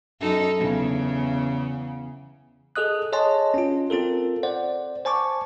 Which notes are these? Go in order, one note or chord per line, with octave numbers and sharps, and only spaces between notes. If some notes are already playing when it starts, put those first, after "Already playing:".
F#2 D#4 A4
E2 C#3
G#4 A4 D#5 D#6 F#6
G#4 C#5 D#5 G#5 A5 C6
C#4 F4
C4 F4 A4 A#4
C5 D5 F#5
C5 G#5 A5 C#6 D6